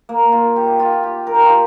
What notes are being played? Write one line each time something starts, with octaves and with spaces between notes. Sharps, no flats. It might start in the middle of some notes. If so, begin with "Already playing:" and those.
A#3
F4
G4
F4
G4
A#4
G4
F4
G4